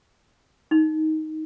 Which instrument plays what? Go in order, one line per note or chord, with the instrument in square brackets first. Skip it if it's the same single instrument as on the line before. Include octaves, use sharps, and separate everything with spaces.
[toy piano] D#4